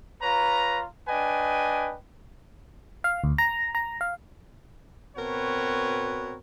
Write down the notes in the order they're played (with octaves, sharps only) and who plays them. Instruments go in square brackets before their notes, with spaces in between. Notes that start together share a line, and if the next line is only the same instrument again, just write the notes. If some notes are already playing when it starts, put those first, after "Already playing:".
[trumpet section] F4 B4 C#5 A#5
D4 B4 D#5 G5 G#5
[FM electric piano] F5
D2
A#5
A#5
F5
[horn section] B2 C4 F#4 A#4 B4 C#5